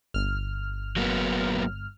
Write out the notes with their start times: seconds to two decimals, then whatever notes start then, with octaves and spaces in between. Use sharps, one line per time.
0.14 G1 F6
0.96 F#3 A#3 B3